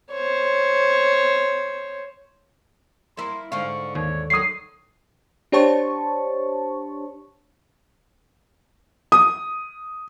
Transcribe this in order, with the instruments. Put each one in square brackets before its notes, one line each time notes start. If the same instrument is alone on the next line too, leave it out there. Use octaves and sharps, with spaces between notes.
[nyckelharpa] C5 C#5
[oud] A#3 E4 [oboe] C6
[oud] G#2 D3 F5 [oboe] C#6
[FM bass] D#2 [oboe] C#5
[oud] D3 D#3 F#3 [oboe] C#5 [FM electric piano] D#6 C7
[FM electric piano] D4 G4 C5 C#5 A5 C#6
[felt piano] D#6